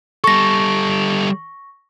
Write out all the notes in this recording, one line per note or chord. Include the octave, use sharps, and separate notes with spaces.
G3 A4 C#6 A#6